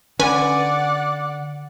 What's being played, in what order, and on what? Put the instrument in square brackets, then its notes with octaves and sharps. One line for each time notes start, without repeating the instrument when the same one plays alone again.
[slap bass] D3 [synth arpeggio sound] C#4 B4 G#5 [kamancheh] D5 F#5